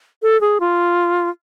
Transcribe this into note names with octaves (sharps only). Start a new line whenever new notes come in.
A4
G#4
F4